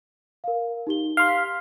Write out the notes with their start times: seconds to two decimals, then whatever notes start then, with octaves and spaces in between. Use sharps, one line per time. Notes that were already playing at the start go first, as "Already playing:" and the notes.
0.44 A#4 F5
0.87 D#4 G4 G7
1.17 F5 C6
1.29 B6